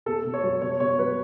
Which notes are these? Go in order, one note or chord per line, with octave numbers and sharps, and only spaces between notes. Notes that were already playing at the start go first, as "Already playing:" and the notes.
B2 A4
B2
C#5
F#3
B2 C#5
B2 C#5
F#3 B4